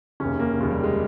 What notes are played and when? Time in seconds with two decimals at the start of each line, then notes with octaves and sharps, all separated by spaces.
0.20 F1 D#2 C#3 C#4
0.39 A#3
0.58 F1 D#2 C#3
0.71 G3
0.84 G#3